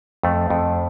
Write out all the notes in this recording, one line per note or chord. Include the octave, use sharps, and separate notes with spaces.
F2 A3
F2